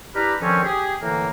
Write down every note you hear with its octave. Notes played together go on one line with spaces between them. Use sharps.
D4 E4 G4 B4 A#5 F6
D3 D#3 F3 C4 C#4
G4 G#4
A2 D3 E3 A#3